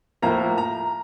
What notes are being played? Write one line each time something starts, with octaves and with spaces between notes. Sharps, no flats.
A2 F3 A#3 A#5
A#5